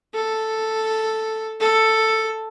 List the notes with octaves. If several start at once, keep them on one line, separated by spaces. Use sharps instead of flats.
A4
A4